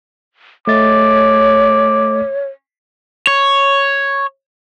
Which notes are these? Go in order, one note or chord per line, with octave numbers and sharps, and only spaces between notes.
A3 C#5 D#5 D6 A6
C#5